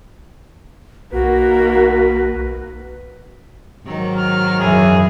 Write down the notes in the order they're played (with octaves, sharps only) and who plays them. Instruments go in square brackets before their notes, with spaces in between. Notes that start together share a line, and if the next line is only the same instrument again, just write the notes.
[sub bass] B1 [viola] D#3 A#3 [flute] F#4 [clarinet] B4
[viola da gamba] G#2 D#3 F#3
[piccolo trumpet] F6
[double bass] F#2 E3 [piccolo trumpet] G#4